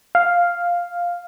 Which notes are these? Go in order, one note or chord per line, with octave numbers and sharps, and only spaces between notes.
F5